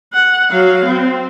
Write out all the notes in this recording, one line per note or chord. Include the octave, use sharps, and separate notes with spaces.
F#5
F#3 F5
C4